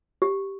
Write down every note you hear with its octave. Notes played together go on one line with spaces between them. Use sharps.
G4